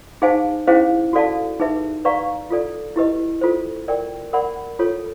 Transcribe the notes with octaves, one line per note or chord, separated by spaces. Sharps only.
D#4 G#4 C5 F5 G#5
C#4 E4 G#4 C5 F5
F#4 A4 D5 F5 A5
D#4 G#4 B4 E5
B4 D5 F5 A#5 C#6
F4 A4 D5
E4 G4 B4 D#5
F4 A4 C5
A#4 D5 G5
A#4 D5 F#5 B5
F4 A4 C#5